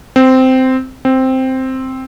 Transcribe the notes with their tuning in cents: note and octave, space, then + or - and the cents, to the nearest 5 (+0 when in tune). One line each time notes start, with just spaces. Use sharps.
C4 -10
C4 +0